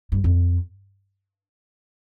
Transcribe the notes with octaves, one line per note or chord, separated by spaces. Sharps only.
G2
F2